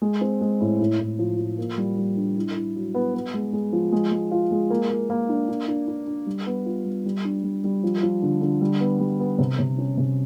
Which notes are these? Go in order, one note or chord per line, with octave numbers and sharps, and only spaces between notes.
G#3
C4
G#3
A2
A2
A2
F3
F3
A#3
G3
G3
D4
E4
E4
F#3
B3
B3
G#3
G#3
F3
G#3
G#3
F4
G#3
A#3
A#3
A#3
D4
D4
D4
D4
D4
G3
B3
F4
G3
G3
D4
G3
G3
F3
F3
D3
D3
G3
B3
G3
B3
C3
C3
C#4
C3